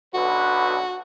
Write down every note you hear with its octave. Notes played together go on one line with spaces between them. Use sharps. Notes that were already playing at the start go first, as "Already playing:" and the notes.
B1 D3 F#4 B4